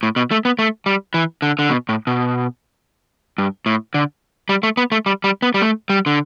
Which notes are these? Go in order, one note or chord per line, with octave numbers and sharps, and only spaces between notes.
A2
B2
A3
B3
A3
G3
E3
D3
D3
B2
A2
B2
G2
A2
D3
G3
A3
B3
A3
G3
G3
B3
G3
A3
G3
D3